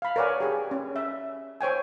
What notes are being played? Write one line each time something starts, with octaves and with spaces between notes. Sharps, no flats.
F5 B5
A#4 B4 C#5 D5 F#5 G#5
G4 G#4
C#4
E5
C5 C#5 G5 G#5